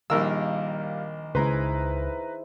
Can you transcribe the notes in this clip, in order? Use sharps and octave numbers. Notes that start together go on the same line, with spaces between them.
A#1 D#3 G3 A#4 F5 E6
C#2 E4 G#4 B4 C5 A#5